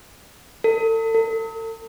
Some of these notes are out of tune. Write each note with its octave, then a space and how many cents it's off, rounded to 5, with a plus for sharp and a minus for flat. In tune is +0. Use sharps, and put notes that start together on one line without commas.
A4 +40
A4 +45